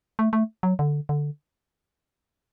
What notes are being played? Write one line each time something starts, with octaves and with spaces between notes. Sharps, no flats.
A3
A3
F#3
D3
D3